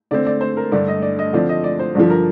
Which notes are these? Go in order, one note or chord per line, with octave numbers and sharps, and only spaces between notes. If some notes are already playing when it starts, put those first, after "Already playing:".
D3 A3 C4 D5
D5
C5
A#4
G2 D3 A3 D5
D#5
D5
D#5
D3 F3 C4 D5
D#5
D5
C5
G2 D3 F3 D5
A#4